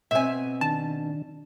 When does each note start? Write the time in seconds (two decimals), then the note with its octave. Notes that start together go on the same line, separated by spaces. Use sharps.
0.11 B2 C4 E5 G#5
0.61 D#3 D4 A5